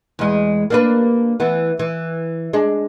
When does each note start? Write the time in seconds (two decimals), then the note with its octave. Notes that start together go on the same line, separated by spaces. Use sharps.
0.19 E2 G#3
0.70 A#3 D4 B4
1.40 E3 B3
1.79 E3
2.53 G#3 D4